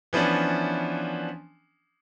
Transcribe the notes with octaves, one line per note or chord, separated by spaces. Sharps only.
E3 F3 B3 C#4 D4